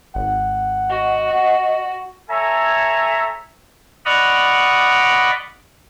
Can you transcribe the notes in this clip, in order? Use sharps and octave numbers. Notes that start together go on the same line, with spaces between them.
G#1 F#5
F#4 D#5
A4 C#5 E5 G#5 A#5
D5 D#5 F#5 B5 C#6 F6